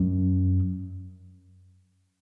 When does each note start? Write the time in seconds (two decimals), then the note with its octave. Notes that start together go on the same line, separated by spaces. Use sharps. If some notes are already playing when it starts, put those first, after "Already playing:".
Already playing: F#2